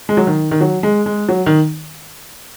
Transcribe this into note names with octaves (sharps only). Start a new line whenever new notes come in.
G#3
F#3
D#3
D#3
F#3
G#3
G#3
F#3
D#3